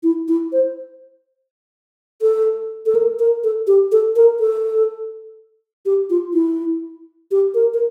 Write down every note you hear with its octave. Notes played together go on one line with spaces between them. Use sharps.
E4
E4
C5
A4
A4
A#4
A#4
A4
G4
A4
A#4
A4
G4
F4
E4
G4
A#4
A#4